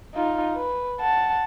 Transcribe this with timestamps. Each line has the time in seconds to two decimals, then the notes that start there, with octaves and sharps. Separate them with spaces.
0.15 D#4 F4
0.56 B4
1.00 F#5 A5